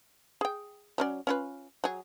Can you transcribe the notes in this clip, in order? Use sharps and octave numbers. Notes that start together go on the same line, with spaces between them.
G#4 G5
F#3 C#4 D5
C#4 F4 B4
F#3 G#4